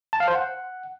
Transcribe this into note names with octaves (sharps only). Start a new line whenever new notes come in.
A5
F5
C5
F#5